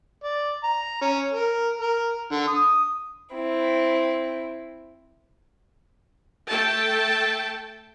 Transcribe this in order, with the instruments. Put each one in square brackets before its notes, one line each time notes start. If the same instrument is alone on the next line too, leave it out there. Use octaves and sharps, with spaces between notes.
[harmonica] D5
A#5
C#4
A#4
A#4
D3
D#6
[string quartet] C4 E4
[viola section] A3 A4 G5 A5